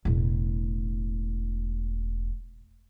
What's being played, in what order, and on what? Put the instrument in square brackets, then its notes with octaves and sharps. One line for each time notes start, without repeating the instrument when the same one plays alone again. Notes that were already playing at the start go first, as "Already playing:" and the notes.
[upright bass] E1 A2